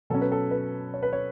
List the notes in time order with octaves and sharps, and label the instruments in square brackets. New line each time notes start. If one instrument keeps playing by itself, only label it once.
[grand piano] B2 F#3 C#4 A4
B4
A4
B4
C#5
B4
C#5